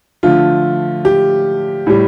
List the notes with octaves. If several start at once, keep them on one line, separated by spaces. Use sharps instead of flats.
D3 F3 A3 F4
G4
A2 G3